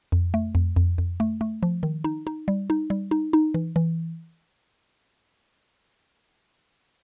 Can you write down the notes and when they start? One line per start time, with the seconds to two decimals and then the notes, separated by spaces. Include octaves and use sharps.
0.12 F2
0.34 A3
0.55 F2
0.76 F2
0.98 F2
1.20 A3
1.41 A3
1.63 F3
1.83 D#3
2.04 D#4
2.27 D#4
2.48 G3
2.70 D#4
2.90 G3
3.11 D#4
3.33 D#4
3.54 E3
3.76 E3